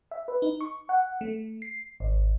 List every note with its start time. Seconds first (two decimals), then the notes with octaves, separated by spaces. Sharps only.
0.11 E5
0.28 B4
0.42 D#4
0.61 C#6
0.89 F#5
1.21 A3
1.62 C7
2.00 G#1